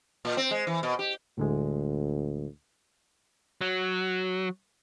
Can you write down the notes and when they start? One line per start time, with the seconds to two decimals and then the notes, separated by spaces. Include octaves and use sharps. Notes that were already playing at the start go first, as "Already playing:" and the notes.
0.25 A#2
0.37 C4
0.51 G#3
0.67 E3
0.83 B2
0.99 G4
1.38 D2 A2 D3 G#3
3.61 F#3